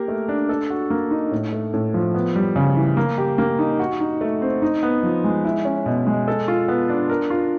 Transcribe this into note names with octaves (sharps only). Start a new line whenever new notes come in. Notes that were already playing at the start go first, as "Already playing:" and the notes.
Already playing: A#3 G4 A#4
A3
D4
A4
F#4
A#3
D#4
A2
A3
A2
F3
B3
G3
C#3
E3
A#3
G4
A#3
D#4
F#4
D#4
A3
C4
D#4
B3
F3
G#3
E4
C#4
B2
G#3
A4
F4
B3
D4
A#4
F4